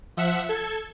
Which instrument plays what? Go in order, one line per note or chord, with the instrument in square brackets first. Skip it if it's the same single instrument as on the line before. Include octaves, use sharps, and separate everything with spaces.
[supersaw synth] F3 E5 F#5
A4 G#6